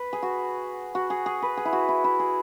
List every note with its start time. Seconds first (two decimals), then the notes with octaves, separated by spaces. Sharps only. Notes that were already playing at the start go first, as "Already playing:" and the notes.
Already playing: B4
0.13 G#4
0.23 F#4
0.95 F#4
1.10 G#4
1.26 G#4
1.42 B4
1.57 G#4
1.65 E4
1.73 F#4
1.89 E4
2.04 E4
2.19 G#4